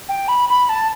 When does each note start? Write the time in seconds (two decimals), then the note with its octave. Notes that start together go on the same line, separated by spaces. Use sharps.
0.09 G5
0.28 B5
0.49 B5
0.69 A5